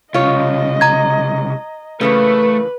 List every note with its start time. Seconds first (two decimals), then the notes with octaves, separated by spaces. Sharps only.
0.14 C2 C#3 F4 C#5 D#5
0.81 A#5 G#6
2.01 C#3 E3 A3 A#3 B4